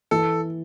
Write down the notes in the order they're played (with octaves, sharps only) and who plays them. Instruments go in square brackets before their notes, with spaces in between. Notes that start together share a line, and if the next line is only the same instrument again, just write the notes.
[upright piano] E3 [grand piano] A4